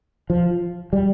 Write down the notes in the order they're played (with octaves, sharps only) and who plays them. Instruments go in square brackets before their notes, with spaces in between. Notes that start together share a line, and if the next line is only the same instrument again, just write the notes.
[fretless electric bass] F3
G3